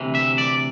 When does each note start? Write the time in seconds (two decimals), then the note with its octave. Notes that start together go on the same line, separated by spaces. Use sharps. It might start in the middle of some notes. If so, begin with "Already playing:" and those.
Already playing: D2 C3 E3
0.15 E5
0.38 D5